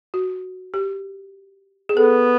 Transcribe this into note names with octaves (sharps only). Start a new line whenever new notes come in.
F#4
G4
G#4
B3 A4